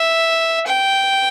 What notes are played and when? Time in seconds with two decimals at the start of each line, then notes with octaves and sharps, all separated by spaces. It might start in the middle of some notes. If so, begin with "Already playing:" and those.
Already playing: E5
0.67 G5